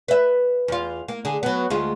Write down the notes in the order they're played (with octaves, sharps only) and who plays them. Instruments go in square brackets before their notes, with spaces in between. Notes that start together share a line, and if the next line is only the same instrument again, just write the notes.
[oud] B4 E5
E2 F4
A#3
D3 G#4
F#3 B3
D2 G#3 F4